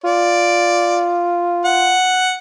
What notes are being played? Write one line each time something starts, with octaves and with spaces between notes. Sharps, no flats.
F4 D5
F#5